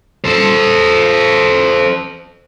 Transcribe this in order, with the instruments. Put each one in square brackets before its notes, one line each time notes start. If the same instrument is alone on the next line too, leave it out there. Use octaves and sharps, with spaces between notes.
[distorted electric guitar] A4 C5